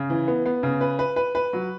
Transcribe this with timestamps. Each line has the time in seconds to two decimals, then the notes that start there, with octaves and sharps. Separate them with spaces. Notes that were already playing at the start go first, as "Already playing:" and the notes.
Already playing: C#3
0.10 E3
0.28 B3
0.46 B3
0.63 C#3
0.81 B4
0.99 B4
1.16 B4
1.35 B4
1.53 F#3